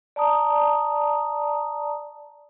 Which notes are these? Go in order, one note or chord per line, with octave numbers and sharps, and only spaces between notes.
D5 A5 A#5 D#6